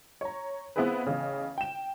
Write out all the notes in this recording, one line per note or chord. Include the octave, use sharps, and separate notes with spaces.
C#5 A#5
B3 C4 E4 F4 G#4 B4
A1 C#3
G5 E7